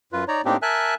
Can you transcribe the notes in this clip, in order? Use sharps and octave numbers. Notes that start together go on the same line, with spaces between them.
F#2 F4 B4
D#4 C#5 D5 A#5
A2 A#3 C4 D4 D#4 G4
A#4 E5 G#5 A5 F#6